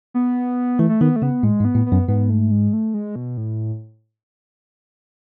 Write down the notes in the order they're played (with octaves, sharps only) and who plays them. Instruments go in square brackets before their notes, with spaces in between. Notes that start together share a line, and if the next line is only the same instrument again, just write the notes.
[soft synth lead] B3
[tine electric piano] E3 [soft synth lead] A3
[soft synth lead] A3
[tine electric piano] D#3 [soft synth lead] B3
[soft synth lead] A3
[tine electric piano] C#3 [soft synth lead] B3
[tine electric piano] A2 [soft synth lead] G#3
[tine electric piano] G#2
[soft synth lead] B3
[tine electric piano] A2
[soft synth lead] B3
[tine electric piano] F#2
[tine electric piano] G#2 [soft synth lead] B3
[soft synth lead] A3
G#3
A3
G#3
B2
A2